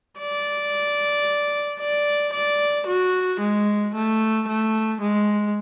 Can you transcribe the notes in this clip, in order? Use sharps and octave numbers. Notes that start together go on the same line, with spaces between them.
D5
D5
D5
F#4
G#3
A3
A3
G#3